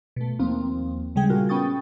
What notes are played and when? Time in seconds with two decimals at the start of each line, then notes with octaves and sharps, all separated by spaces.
0.16 B2 A3
0.39 D#2 F3 A#3 C4
1.16 C#3 G3 G#3 G#4 G5
1.29 A#2 G3 F4 F#4 A#4
1.49 B3 C#4 G5 C#6 D#6 A6